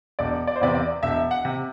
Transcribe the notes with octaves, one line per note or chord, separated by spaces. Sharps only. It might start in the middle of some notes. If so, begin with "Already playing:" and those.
E1 D5
D5
C5
E2 C3 D5
D5
E1 E5
F#5
C3